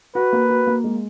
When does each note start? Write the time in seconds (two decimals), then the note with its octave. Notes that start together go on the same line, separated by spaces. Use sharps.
0.15 F#4 B4
0.33 A#3
0.50 F#4
0.67 A#3
0.84 G#3